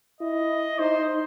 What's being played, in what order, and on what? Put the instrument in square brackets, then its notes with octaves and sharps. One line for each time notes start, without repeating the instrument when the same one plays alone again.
[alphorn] E4 [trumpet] D#5
[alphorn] D#4 [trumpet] C5